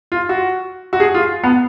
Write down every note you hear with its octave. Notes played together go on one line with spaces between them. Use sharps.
F4
F#4
F#4
G#4
F4
B3